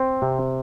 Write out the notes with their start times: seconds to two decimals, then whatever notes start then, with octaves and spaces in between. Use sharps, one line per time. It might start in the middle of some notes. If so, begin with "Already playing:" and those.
Already playing: C4
0.22 C3